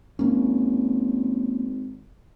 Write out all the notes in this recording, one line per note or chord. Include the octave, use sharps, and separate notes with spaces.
G#1 A#3 C#4